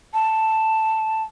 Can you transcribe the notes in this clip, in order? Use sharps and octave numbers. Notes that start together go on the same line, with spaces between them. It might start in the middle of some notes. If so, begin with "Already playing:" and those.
A5